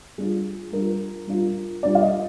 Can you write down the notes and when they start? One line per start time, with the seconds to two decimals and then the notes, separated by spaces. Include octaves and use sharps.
0.18 G3 D4 F4 G#4
0.72 G3 D4 F4 A#4
1.27 G3 D4 F4
1.83 G3 D4 F4 D5
1.95 F5
2.02 D#5